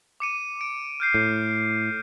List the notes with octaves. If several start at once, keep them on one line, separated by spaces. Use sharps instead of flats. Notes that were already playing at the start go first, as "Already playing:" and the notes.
D6 C#7 D#7
D7
F6 G6 C7
A2